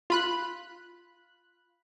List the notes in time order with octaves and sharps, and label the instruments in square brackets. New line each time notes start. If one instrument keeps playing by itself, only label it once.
[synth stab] F4 B5 F#6